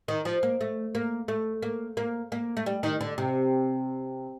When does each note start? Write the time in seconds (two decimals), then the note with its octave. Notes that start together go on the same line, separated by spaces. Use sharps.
0.08 D#3
0.25 F3
0.43 A#3
0.61 A3
0.95 A#3
1.28 A3
1.63 A#3
1.97 A#3
2.32 A#3
2.57 A3
2.66 G3
2.83 D#3
3.01 D3
3.18 C3